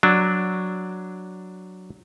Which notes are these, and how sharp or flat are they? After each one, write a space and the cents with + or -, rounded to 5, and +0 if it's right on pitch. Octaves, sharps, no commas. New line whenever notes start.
F#3 +0 D4 +0